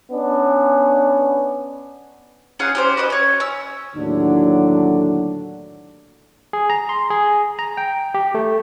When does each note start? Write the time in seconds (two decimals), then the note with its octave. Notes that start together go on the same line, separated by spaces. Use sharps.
0.12 B3 C#4 D4
2.59 C#4 F4 G#4 F#5
2.75 C#4 G4 C5
2.97 F#4 B4 D5 D#5
3.10 C#4 C#5
3.40 C#4 E6
3.95 D#2 A2 D3 F#3 D4
6.53 G#4
6.70 A#5
6.89 C6
7.10 G#4
7.59 A#5
7.77 G5
8.14 G4
8.35 A3